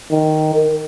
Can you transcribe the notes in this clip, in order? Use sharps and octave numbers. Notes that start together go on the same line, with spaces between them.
D#3
A#4